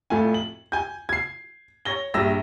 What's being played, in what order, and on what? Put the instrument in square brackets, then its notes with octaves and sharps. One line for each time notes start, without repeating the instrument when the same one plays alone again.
[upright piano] F2 A2 A3 F4 G#5
F#7
G#5 G6
G#6 C7
C#5 A#6 G7
A#1 G2 E5 E6 A#6